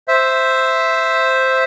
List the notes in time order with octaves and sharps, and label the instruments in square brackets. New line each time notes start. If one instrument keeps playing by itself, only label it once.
[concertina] C5 E5